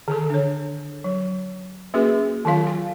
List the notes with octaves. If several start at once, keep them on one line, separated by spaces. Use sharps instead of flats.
D3 D#3 A4
D4 C#5
F#3
A#3 C#4 F#4 G#4 B4
D#3 F#3 F4 F5
G#5